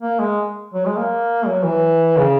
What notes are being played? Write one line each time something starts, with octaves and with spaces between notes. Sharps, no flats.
A#3
G#3
F#3
G#3
A#3
F#3
E3
C#3